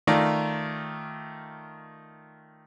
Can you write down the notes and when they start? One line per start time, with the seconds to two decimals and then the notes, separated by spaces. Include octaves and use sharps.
0.07 D#3 A3 F4 D5 A#5